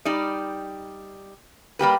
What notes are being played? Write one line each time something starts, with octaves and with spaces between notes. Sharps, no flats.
G3 D#4 D5
G3 A#3 G4 B4